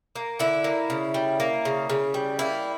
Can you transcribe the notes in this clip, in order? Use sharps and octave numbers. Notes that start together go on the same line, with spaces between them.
A#3
D3 E4
A#3
C#3
G3
A#3
C#3
C#3
G3
A#3 E4